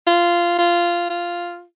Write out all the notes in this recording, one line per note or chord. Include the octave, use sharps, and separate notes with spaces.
F4
F4
F4